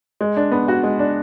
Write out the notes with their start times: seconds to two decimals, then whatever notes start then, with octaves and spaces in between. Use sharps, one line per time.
0.21 G#3
0.36 D4
0.51 B3
0.68 F#4
0.83 G#3
0.99 D4